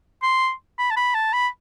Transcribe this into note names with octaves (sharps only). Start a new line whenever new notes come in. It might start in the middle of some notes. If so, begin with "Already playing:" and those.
C6
B5
A5
B5
A5
B5